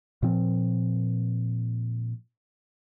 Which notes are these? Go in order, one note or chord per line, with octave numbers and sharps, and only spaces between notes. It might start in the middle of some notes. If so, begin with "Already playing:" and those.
A#2 F3 C4